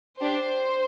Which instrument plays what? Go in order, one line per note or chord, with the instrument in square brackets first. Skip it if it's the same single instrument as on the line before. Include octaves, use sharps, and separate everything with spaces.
[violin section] D4 G4 C5